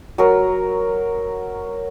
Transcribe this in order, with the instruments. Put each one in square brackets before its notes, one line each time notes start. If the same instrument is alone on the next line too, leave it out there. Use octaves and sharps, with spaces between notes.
[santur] F#3 A#4